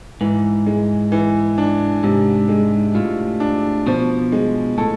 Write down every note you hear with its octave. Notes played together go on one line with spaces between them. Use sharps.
G#2 E3
G#3
E3
D4
G#2 C3
G#3
A2 F4
D4
B2 F3
G#3
A2 A4